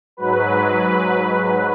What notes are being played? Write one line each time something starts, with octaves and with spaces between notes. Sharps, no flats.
G#2 F#3 B4
B4